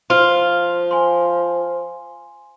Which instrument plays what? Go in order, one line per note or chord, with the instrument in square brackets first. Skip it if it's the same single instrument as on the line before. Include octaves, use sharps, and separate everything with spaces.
[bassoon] F3 [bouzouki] F4 [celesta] C5
[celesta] G#5 C6